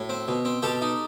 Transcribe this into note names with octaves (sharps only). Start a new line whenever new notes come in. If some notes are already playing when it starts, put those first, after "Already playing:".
Already playing: A2 F#4
C4
B2
C4
B2 G4 A4
D#4